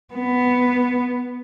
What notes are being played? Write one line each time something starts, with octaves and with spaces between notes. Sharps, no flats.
B3